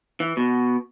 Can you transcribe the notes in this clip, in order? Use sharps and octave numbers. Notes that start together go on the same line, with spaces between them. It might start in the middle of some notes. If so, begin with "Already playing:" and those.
E3
B2